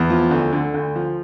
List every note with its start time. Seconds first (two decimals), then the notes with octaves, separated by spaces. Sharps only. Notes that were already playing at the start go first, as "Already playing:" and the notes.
Already playing: E2
0.10 F3
0.31 D2
0.52 D3
0.74 D2
0.95 F3